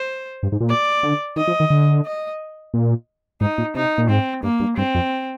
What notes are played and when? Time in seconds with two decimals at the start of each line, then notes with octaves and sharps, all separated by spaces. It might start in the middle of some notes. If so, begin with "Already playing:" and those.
Already playing: C5
0.43 G2
0.52 G#2
0.61 A#2
0.69 D5
1.03 D3
1.36 D#3 D#5
1.48 F3
1.60 D#3
1.70 D3
2.05 D#5
2.74 A#2
3.41 G#2 D#4
3.58 A#2
3.75 C3 D#4
3.98 A#2
4.09 G#2 C4
4.43 G2 A#3
4.60 G2
4.77 G2 C4
4.95 F2